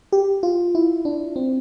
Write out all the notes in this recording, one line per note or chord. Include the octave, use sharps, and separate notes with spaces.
G4
F4
E4
D4
C4